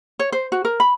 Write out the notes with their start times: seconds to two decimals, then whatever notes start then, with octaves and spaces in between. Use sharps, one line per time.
0.19 C#5
0.32 C5
0.52 F#4
0.65 A#4
0.80 B5